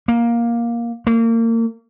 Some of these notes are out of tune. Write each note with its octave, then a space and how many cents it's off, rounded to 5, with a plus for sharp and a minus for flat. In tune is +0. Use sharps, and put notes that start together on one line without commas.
A#3 +10
A#3 -30